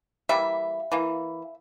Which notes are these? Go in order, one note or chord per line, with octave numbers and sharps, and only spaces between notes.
E3 G3 A#3 E5
E3 A#3